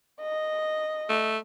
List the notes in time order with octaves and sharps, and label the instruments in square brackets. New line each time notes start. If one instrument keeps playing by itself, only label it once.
[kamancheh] D#5
[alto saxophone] A3